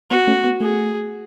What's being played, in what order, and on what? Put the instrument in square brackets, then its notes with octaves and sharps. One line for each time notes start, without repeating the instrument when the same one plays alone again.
[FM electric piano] B3 [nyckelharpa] F#4
[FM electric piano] A3 C#4
B3
[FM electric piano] A3 [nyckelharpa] G#4